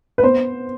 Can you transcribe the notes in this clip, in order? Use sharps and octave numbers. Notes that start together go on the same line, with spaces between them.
B4
B3 C5